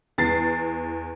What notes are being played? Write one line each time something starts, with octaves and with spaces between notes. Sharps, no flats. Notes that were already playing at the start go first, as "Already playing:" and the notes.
E2 A6 C7